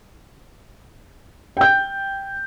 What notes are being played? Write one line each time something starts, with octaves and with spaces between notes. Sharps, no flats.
G5 G6